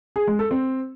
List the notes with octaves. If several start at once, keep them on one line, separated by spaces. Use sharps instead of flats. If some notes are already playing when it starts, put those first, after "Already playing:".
G#4
G#3
A4
C4